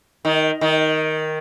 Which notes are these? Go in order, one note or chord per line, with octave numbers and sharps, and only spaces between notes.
D#3
D#3